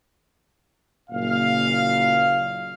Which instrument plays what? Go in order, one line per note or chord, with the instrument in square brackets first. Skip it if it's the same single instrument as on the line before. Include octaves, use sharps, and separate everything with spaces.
[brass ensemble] F#1 A#2 F5